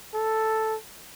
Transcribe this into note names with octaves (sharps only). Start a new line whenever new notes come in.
A4